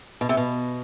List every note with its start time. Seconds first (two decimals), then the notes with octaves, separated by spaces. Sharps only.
0.21 B2
0.29 C3
0.37 B2